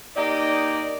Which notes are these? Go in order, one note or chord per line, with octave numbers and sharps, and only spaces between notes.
A#3 D#4 G4 D5 D#5